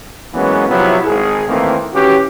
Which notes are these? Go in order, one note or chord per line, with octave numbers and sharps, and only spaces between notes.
E3 F#3 G#3 A#3 B3 C#4
C3 F3 F#3 B3 E4
G#1 G#4
D#3 E3 A3 A#3 C4
G#1 E3 C#4 F#4 G4